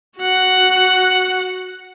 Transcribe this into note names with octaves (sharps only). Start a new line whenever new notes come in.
F#4 F#5